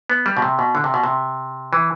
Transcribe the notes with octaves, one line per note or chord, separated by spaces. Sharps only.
B3
G3
B2
C3
B2
D3
C3
B2
C3
E3